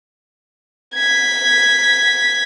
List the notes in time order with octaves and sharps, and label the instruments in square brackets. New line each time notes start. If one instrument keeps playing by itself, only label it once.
[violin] G#6 B6